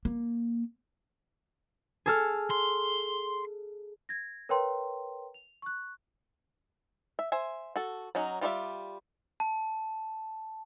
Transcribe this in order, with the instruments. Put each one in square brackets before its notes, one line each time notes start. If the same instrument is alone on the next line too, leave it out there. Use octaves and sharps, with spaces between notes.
[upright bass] A#3
[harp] G#4 A4 F6
[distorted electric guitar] C6
[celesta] G#6 A#6
A#4 B4 C#5 G5 A#5 C6
F7
C#6 F#6
[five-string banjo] E5
C5 E5 G#5
F#4 A4
F#3 C#4 D#4 F#4
G3 F4 G4 A#4 E5
[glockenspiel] A5